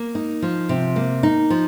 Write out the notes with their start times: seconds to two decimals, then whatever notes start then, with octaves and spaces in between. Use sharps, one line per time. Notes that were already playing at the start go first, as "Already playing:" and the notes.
Already playing: A#3
0.15 D#4
0.42 F3
0.69 C3
0.96 A#3
1.23 D#4
1.50 F3